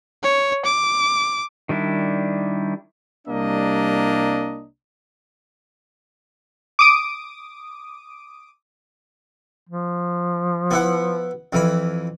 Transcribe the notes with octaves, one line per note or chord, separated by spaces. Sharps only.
C#5
D6
D#3 G3 D4 E4
C2 G3 A#3 D4 D#5 A#5
D6 D#6 D7
F3
B3 E4 F#5
F2 E3 B5